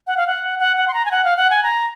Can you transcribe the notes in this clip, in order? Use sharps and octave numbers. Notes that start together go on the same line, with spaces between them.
F#5
F5
F#5
F#5
F#5
C6
A#5
G#5
F#5
F5
F#5
G#5
A#5